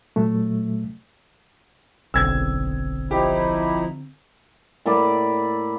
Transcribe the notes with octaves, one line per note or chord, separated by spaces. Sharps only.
A#2 F#3 A3
F#1 B1 D3 C4 E6 G#6
F3 D#4 E4 G4
A2 A#3 D5 B5